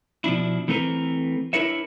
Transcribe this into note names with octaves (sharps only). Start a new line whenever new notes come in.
B2 F3 D4 E4
E3 A3 C4 A#4 B4
D4 E4 A#4 B4 C#5 E5